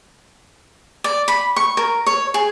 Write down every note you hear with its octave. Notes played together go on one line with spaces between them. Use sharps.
D5
B5
C#6
A#4
C#5
G#4